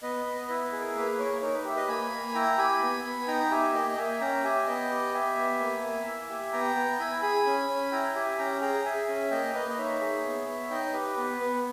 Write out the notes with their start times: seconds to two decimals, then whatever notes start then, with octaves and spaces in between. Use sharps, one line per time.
0.02 B3 B4 D#5
0.26 B3
0.49 E4 B4
0.64 B4
0.72 G#4
0.80 A#4
0.95 A#3 B4
1.18 A#3 A#4 C#5
1.42 D#4 A#4 C#5
1.54 B4
1.65 G4 E5
1.76 B4 D#5
1.88 A#3 G#5 B5
2.12 A#3
2.34 E4 G5 A#5
2.58 G4 G#5 B5
2.82 B3
3.05 B3
3.28 D#4 G5 A#5
3.51 G4 E5 G#5
3.74 A#3 D#5 G5
3.97 A#3 E5 G#5
4.20 C#4 G5 A#5
4.43 G4 E5 G#5
4.66 B3 D#5 G5
4.90 G4
5.14 G4 E5 G#5
5.37 B3
5.60 A#3
5.83 A#3
6.06 E4
6.29 G4
6.53 B3 G5 A#5
6.76 B3
6.99 E4 G#5 B5
7.22 G#4 G#5 B5
7.45 C#4
7.69 C#4
7.92 E4 G5 A#5
8.15 G4 E5 G#5
8.38 C#4 G5 A#5
8.61 G#4 G5 A#5
8.84 G#4 E5 G#5
9.08 C#4
9.31 A#3 D#5 G5
9.54 A#3 B4 D#5
9.70 D#5
9.78 D#4 C#5 E5
10.01 G#4
10.24 B3
10.48 B3
10.70 D#4 D#5 G5
10.94 G4 B4
11.17 B3
11.41 B3